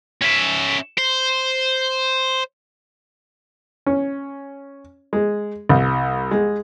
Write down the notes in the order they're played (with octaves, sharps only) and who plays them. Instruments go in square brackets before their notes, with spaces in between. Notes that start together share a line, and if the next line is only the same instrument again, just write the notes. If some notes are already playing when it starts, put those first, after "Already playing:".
[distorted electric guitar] C#4 E5
C5
[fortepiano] C#4
G#3
C2
G#3